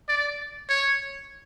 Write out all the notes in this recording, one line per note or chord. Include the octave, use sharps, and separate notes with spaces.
D5
C#5